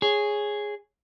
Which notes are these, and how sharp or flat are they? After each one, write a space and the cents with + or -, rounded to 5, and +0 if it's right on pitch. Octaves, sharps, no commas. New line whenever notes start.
G#4 +0 C#5 +0